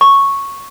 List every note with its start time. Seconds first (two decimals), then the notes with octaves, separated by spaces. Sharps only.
0.01 C#6